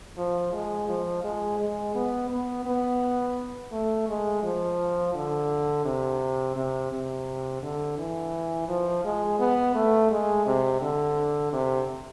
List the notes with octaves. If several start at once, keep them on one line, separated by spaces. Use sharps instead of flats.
F3
G#3
F3
G#3
G#3
B3
B3
B3
A3
G#3
F3
D3
C3
C3
C3
D3
E3
F3
G#3
B3
A3
G#3
C3
D3
C3